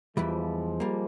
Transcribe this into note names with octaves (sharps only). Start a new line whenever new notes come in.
E2 E3 F3 G3 G#3
G3 A#3